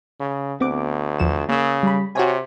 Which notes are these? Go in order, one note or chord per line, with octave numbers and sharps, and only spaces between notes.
C#3
D2 B3 C4 D6
E2 F3 E7
C#3 A#3 E6
G3 B5
C3 F#4 C#5 G#5